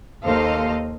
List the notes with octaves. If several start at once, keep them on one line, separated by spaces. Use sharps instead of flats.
D#2 A4 C5 D#5 F5